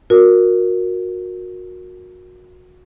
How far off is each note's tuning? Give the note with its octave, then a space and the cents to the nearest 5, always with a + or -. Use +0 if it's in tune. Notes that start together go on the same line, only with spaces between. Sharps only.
F#4 -25 A#4 +0